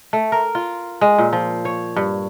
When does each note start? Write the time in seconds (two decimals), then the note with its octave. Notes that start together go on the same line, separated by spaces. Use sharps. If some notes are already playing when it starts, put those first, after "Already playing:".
0.13 A3
0.32 A#4
0.55 F4
1.01 G#3
1.18 A#2
1.33 F3
1.65 C#5
1.96 G2